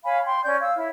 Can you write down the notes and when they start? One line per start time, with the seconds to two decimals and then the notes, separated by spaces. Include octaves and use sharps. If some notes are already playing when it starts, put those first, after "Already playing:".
0.04 C#5 F5 G#5 B5
0.26 G5 C6
0.44 C#4 C#5 D5 G6
0.61 F5 E6
0.75 E4 C#5